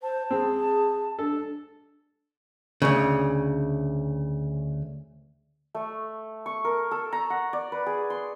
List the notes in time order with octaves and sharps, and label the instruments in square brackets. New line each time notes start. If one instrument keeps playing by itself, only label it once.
[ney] C5 [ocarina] A5
[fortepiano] C4 [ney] G#4
[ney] D4 [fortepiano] A4
[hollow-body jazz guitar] D2 C#3
[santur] A3
C#6
A#4
A4
A#5
F#5
D5
B4
G#4
C6